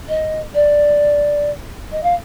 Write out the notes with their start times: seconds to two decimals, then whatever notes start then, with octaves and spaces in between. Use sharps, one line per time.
0.08 D#5
0.54 D5
1.92 D#5
2.03 F5